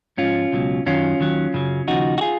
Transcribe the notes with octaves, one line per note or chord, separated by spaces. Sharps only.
G#2 F3 C#4 F4
C#2 B2 F#3
F#2 D#3 F#3 C#4 F4
D#2 D#3 F#3
F#2 C#3 F#3
D#2 C#3 F3 D#4 F#4
F#4
F4 G#4